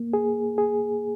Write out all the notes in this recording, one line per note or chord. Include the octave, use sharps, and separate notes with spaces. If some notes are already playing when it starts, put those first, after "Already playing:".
Already playing: A#3
G#4
G#4